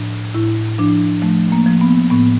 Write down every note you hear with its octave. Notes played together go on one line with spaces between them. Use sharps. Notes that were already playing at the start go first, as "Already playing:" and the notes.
Already playing: A2 F3 D4
A2 E4
F3 D4
F3 A3
A#3
F3
B3
A2 B3